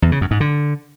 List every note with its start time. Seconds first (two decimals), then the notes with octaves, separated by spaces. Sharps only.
0.02 E2
0.12 C#3
0.21 F#2
0.31 G#2
0.40 D3